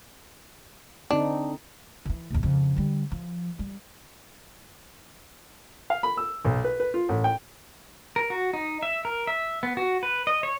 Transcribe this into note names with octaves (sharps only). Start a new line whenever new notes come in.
D3 C4 D4 D#4
D#3 E3
A#1 D#2
F2 C#3
D3 G3
F3
G3
F5
B5
E6
B1
B4
B4
F4
A1
G5
A#4
F#4
D#4
E5
A#4
E5
B3
F#4
B4
D#5
C#5